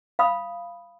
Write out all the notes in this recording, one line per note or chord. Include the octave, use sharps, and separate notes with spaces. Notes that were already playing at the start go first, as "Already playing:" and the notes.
F5 B5 D#6